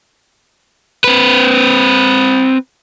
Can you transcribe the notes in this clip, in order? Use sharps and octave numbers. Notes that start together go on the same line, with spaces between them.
C4 B4